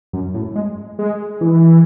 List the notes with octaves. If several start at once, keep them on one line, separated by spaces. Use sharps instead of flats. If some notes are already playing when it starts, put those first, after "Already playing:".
F#2
A2
G#3
G#3
E3